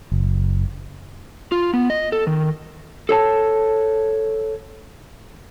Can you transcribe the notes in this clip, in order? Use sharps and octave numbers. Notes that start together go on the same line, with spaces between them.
F#1
F4
B3
D#5
A4
D#3
A4 C#5 A5